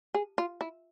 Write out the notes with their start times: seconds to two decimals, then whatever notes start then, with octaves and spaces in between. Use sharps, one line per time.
0.14 G#4
0.38 F4
0.61 E4